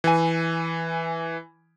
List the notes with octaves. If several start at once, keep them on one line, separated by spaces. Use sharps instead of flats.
E3 G#5